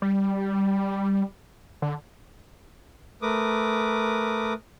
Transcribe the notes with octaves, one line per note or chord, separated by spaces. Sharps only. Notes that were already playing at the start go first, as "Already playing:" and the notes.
G3
D3
A3 A#4 B4 D6 D#6